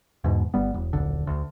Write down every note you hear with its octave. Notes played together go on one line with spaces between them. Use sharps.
E2 G#2 B2
G1 G3 B3
E1
D#1 B1 D3
D2